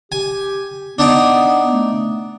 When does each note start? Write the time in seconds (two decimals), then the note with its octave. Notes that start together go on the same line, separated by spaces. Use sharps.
0.12 G4 G#5
0.98 B3 D4 D#4 D5
1.72 A3